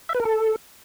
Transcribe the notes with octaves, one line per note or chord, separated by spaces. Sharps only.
E5
B4
A#4
A4